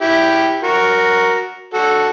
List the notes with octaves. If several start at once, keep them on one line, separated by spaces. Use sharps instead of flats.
E4 G4 G5
F#4 A#4
F#4 A4